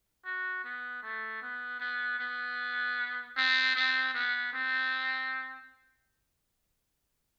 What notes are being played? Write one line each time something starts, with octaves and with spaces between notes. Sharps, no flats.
F#4
B3
A3
B3
B3
B3
C4
C4
B3
C4